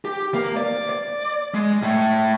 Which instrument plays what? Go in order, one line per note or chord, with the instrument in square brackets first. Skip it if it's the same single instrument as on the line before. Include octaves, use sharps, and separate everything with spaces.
[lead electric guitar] G4
A#3
D5
D5
G#3
A2